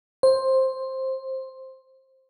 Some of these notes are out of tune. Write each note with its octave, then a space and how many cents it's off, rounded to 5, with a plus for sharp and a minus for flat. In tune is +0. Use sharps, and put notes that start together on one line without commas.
C5 +10